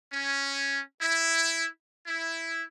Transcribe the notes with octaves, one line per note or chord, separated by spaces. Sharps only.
C#4
E4
E4